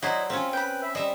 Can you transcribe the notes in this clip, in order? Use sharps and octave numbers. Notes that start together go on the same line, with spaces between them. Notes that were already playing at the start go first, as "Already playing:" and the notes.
F#3 E4 C5 D5 D#5
C4 C#4 F4 E5
B4 G5 B5
E5
G3 C5 D#5 E5